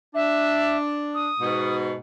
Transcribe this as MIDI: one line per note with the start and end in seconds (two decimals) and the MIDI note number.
0.15 1.28 62
0.15 0.77 76
1.14 1.76 87
1.40 1.94 44
1.40 1.94 47